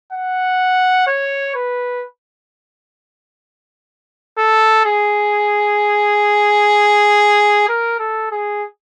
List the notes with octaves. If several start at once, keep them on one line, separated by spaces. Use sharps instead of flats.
F#5
C#5
B4
A4
G#4
A#4
A4
G#4